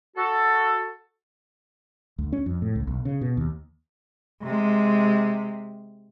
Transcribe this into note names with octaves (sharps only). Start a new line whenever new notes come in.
F#4 A4
D2
C#4
F2
A2
C#2
B1
C#3
B2
D#2
C3 G#3